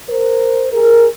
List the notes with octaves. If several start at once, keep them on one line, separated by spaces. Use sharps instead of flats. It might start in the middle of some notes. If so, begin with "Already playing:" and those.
A#4 C5
G#4 A#4